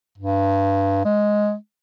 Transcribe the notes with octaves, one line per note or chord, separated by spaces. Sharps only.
G2
G#3